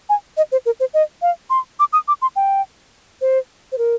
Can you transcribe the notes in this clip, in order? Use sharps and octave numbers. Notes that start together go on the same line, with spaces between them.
G#5
D#5
C5
A#4
C5
D#5
F5
C6
D6
D#6
D6
C6
G5
C5
C5
A#4